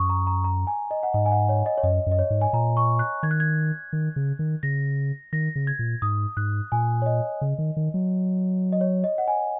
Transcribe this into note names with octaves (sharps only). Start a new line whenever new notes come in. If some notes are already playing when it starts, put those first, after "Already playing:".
Already playing: F#2 C#6 D#6
A#5
A#5
A#5
G#5
D#5
F#5
G#2 D#5
G#5
F#5
C#5
D#5
C#5
F#2 D#5
F#2
D#5
C#5
G#2
G#5
A#2 A#5
C#6
F#6
D#3 G#6
F#6
G#6
D#3
C#3
D#3
C#3 A#6
D#3 A#6
C#3
G#6
A#2
G#2 D#6
G#2 F#6
A#2 G#5
C#5
D#5
C#3
D#3
D#3
F#3
D#5
C#5
D#5
F#5
G#5